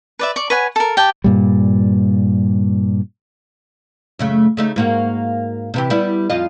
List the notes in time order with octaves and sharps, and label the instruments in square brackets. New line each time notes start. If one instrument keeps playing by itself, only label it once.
[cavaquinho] B4 D5 E5
D5 C#6
B4 C#5 F#5 G#5
A4 A#4
G4 G5 A5
[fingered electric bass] G2 A#2 G3
[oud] F#2 C#3 A3
C#3 A3 D#4
G#2 A#3 F#4
C3 E3 G4
G3 B3 E4
F2 F4 D#5